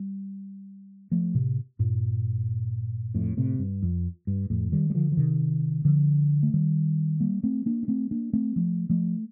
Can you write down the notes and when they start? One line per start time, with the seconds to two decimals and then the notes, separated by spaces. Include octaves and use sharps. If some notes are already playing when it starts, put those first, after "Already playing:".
Already playing: G3
1.12 F3 A3
1.34 A2 C3
1.79 G2 A#2
3.14 F2 A2
3.37 A2 C3
3.59 G2
3.83 F2
4.27 G2
4.50 F2 A2
4.72 D#3 G3
4.90 G3
4.94 D3 F3
5.12 F3
5.17 C3 D#3
5.85 D3 F3
6.43 A3
6.54 D#3 G3
7.20 G3 A#3
7.43 A3 C4
7.66 A#3 D4
7.83 D4
7.88 A3 C4
8.11 A#3 D4
8.33 A3 C4
8.56 F3 A3
8.90 F3 A3